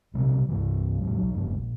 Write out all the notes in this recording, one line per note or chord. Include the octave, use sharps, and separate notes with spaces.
A#1 C3 G3
C2 G2 E3
E2 A2 F#3
B1 F#3
F#1 E2 G2
A#1